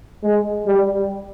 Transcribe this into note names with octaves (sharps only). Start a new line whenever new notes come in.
G#3
G3